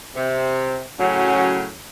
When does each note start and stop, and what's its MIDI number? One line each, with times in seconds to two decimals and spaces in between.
0.16 0.80 48
0.16 0.84 60
0.99 1.69 45
0.99 1.69 49
0.99 1.69 54
0.99 1.56 61